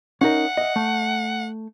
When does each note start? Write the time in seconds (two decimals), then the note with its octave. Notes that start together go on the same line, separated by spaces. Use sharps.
0.21 C#4 D#4 A#4 F#5
0.57 D#5 E5
0.76 A3